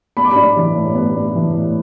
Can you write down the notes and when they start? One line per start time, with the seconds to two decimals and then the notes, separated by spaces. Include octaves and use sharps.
0.17 B3 B5
0.25 D6
0.31 D4 B5
0.57 E3
0.77 A2
0.95 B3
1.16 D4
1.36 E3
1.54 A2